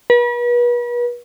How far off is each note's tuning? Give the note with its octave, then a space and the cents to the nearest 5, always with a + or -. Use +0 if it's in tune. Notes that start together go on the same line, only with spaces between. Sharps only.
B4 -40